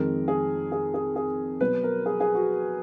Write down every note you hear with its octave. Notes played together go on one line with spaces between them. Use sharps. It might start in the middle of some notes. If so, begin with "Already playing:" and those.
Already playing: F2 D#3 G#3 A#4
G#4
G#4
G#4
G#4
B2 F#3 B3 B4
A#4
G#4
G#4
F#4